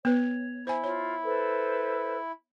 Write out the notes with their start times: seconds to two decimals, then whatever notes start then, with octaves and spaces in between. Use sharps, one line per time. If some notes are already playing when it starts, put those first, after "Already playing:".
0.05 B3 B4 C#5
0.67 E4 C5 G#5
0.84 F4 C#5
1.23 A4 B4 C5